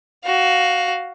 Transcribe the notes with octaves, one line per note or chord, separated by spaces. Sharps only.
F#4 F5